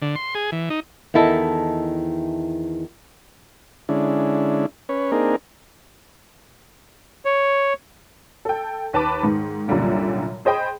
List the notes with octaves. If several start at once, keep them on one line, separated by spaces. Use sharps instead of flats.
D3
C6
G#4
E3
D#4
E2 D#3 E4 A4 D#5 A5
D3 G#3 C#4 D4 E4
C#4 B4 C#5
A#3 C4 D4 D#4 G#4 A#4
C#5
A4 G5
D#2 B4 A5 B5 D6
G#2 D#3
C2 F#2 A#2 D3 G3 A#3
G#4 C5 D#5 G5 B5 D#6